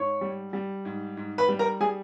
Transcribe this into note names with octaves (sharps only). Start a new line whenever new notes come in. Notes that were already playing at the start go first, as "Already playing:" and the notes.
Already playing: G#2 C#5 C#6
G3
G3
G#2
G#2
B4 B5
G3
A#4 A#5
G3 G#4 G#5